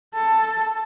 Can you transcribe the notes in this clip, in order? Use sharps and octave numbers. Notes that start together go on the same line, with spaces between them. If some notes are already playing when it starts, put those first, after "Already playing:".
A4